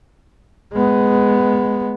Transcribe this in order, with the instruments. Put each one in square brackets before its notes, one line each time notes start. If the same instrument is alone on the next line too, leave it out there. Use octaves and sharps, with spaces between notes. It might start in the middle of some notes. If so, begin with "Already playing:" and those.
[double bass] G#3 B3